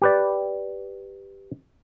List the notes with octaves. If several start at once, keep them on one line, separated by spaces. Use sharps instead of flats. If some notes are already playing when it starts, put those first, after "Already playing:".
G4 B4 D5